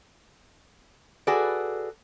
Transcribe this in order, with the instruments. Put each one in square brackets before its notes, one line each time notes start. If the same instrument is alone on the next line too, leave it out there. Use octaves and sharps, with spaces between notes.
[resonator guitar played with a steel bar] F#4 G#4 A4 B4 D5